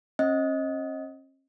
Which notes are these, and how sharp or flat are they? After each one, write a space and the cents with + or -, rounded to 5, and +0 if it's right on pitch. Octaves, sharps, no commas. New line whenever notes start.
C#4 -45 D#5 +15